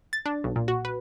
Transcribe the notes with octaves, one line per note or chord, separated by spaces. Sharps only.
A6
D4
B1
A#2
F#4
B4